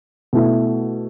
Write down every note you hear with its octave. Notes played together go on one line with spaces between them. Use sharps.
B2 A3 E4